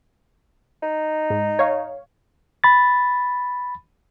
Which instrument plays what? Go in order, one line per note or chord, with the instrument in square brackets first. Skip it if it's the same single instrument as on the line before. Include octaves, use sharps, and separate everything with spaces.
[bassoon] D#4
[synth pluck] G#2
C#5 F5
[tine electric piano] B5 A6